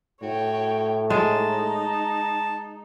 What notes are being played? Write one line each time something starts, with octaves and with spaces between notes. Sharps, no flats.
A2 F#4 C#5 G5
G#3 D#4 A5